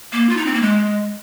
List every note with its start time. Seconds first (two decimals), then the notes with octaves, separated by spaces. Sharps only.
0.12 A#3
0.29 F4
0.37 D#4
0.46 C4
0.54 A#3
0.62 G#3